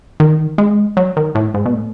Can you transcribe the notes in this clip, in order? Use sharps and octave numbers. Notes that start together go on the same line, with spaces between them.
D#3
G#3
F#3
D#3
A2
G#2
B2
A2